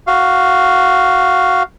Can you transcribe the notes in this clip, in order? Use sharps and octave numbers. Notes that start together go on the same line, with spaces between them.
F#4 F5